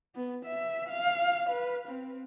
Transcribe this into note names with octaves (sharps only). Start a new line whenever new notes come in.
B3
E5
F5
B4
C4